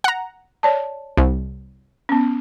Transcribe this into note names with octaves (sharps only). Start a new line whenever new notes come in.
F#5 A#5
C#5 D5 A5
C2
B3 C#4